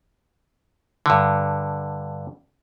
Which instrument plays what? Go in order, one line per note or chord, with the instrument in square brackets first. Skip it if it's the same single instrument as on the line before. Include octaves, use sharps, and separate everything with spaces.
[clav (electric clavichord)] G2 D3